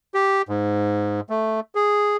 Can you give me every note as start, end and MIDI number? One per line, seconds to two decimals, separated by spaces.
0.14 0.42 67
0.49 1.20 44
1.30 1.60 57
1.75 2.17 68